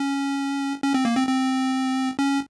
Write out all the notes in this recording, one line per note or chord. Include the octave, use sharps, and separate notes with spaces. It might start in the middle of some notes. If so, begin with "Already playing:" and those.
Already playing: C#4
C#4
C4
A#3
C4
C4
C#4